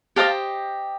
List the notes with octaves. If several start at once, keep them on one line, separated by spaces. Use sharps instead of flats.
G4 C5 D#5 F5 A5